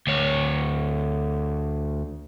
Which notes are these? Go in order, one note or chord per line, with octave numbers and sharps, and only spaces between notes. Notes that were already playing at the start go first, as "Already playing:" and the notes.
D2 C#5